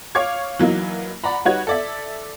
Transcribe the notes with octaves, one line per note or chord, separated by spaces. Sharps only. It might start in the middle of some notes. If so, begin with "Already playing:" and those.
C#5 F5 C#6 D6 G#6
E3 F#3 A#3 D#4
D5 F#5 A#5 B5
G3 D#4 F#4 B4 C#5 G#6
A4 D5 E5